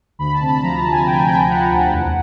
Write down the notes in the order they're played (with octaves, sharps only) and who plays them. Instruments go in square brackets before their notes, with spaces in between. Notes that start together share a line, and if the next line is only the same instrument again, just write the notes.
[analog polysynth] D2 B5
A5
C3
B5
F3 A#5
A5
D2
G#5
D2 G5
G#5
C3 G5
G5
F3 F#5
D2
E2